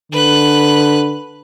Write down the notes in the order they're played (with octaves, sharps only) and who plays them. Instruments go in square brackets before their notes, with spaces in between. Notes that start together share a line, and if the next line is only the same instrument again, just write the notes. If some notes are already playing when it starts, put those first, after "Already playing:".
[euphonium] D3 [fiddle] B4 F#6